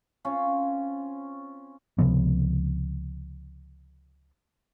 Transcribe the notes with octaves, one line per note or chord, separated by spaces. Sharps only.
C4 C#4 F4
C#2 C3 F3 B3